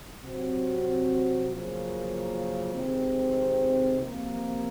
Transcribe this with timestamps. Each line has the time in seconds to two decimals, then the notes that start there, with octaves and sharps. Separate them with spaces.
0.22 C3 F#3 C4 F#4
1.47 F#2 C#3 F3 A#3
2.72 C3 D#3 G#3 C4
3.98 C3 F3 A#3